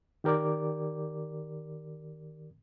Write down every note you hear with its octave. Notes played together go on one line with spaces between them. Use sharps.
D#3 G4 A#4 D5 D6